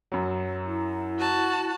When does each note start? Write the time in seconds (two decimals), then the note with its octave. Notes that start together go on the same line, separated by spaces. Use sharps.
0.12 F#2 F#3
0.66 E4
1.19 F#4 A5